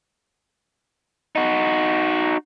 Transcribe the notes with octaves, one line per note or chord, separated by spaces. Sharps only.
D#4 F#4